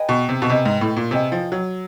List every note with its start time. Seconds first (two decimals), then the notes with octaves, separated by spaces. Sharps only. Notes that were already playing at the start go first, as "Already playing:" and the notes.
Already playing: G#4 B4 D#5 G5
0.09 B2
0.29 C3
0.42 B2
0.49 C3 G#4 B4 D#5 G5
0.65 G#2
0.81 A2
0.96 A#2
1.11 C3 G#4 B4 D#5 G5
1.32 F3
1.52 F#3